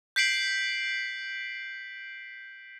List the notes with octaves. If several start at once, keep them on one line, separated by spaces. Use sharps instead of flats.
G6 B6 C7 D7 F#7